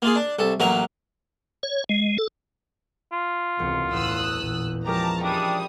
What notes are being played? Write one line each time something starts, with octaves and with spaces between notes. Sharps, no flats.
A#3 F4 G#4
D4
C2 A4
A1 F#3 A#3 F#4 A#5
C#5
G#3
A4
F4
E1 C#2 C3 C#7
E2 A2 D#6 E6 F#6
A1 A#2
F3 G#3 C#4 G4 A#4 A5 A#5
G3 D4 E5 D#6 D#7